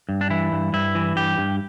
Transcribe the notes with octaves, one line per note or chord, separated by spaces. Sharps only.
G2
D4
E3 E4
G2
G2 E4
E3
G2 G4
G2